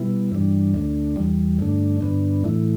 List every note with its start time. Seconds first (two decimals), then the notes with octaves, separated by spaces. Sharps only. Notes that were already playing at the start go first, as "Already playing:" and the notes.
Already playing: B2 G3 B3 E4
0.32 G2 E3 G3 D4
0.74 D2 D3 A3 D4
1.16 E2 E3 G3
1.59 G2 D3 A3 D4
2.01 G2 D3 B3 D4
2.44 A2 E3 A3 E4